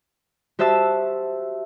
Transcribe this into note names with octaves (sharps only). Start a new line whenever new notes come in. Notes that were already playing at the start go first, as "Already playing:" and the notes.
F#4 G4 C5 E5 A5 E6